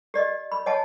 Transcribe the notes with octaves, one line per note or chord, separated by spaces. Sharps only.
G4 D5 D#5
B5
C#5 D#5 F#5 G#5 A5